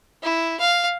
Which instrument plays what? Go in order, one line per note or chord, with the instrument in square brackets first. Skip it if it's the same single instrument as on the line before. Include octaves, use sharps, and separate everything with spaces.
[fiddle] E4
F5